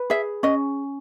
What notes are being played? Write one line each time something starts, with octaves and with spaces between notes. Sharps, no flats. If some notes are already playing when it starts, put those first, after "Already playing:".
Already playing: B4
G#4 E5
C#4 D#5